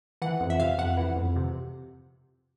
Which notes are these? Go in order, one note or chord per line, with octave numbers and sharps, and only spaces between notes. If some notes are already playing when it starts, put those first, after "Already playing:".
E3 F#5
F2
E5
C3 F5
F2 F#5
E3
F2
C3